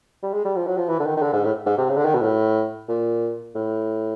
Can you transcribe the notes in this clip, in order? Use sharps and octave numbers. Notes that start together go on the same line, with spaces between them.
G3
G#3
G3
F3
F#3
F3
E3
D3
D#3
D#3
D3
G#2
A2
G#2
C3
C#3
D3
D#3
B2
A2
A#2
A2